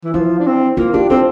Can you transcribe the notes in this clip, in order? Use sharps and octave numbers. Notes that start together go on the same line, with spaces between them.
E3
F3 E4
D4
C4
A#3 F4
D4 G4
C4 A4